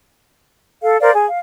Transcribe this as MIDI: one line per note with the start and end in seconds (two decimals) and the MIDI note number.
0.82 0.96 69
0.82 0.96 77
1.01 1.10 70
1.01 1.10 72
1.01 1.10 74
1.01 1.10 77
1.13 1.25 68
1.27 1.39 77